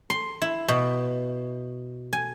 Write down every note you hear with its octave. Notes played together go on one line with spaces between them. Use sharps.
C6
E4
B2
G#5